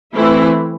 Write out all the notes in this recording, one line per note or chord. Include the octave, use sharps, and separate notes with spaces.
E3 A3 C4 E4